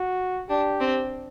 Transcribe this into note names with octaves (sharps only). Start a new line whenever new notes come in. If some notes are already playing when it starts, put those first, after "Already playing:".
Already playing: F#4
D4 G4
C4